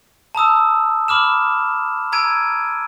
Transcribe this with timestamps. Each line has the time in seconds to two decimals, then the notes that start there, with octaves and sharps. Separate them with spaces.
0.35 A5 A#5 D#6 E6
1.08 B5 D6 F6 E7
2.12 A#5 E6 G#6 D7 D#7